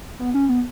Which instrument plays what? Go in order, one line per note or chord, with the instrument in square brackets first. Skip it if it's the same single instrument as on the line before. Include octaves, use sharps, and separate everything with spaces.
[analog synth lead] B3
C#4
B3